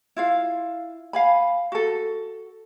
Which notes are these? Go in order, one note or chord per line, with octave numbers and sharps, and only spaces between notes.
E4 F4 F5
F5 G#5 B5
F#4 A4